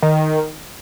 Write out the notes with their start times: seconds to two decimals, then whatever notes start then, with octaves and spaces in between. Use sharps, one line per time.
0.03 D#3